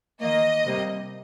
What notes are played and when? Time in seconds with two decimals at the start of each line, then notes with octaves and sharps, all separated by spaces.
0.20 D#3 A#3 D#5
0.64 C3 G3 A#3